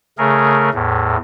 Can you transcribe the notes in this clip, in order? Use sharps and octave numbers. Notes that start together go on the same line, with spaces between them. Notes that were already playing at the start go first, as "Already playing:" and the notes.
C#3 A3 G#4 A#4
E2 A2